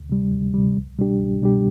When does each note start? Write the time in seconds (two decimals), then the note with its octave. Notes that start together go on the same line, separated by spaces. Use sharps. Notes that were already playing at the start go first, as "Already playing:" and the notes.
Already playing: D2
0.10 C3 G3
0.32 D2
0.54 C3 G3
0.76 C2
0.99 B2 G3 D4 G4
1.20 C2
1.42 B2 G3 D4 G4